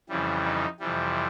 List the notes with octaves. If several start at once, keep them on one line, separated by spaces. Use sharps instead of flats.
F2 C#3 E3 G3
D#4
F2 C3 E3 G3